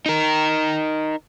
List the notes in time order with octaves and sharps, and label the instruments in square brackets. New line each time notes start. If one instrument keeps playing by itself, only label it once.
[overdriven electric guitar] D#4 A#4